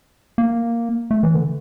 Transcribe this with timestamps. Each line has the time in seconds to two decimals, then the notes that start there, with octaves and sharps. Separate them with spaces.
0.38 A#3
1.11 A3
1.23 E3
1.35 D3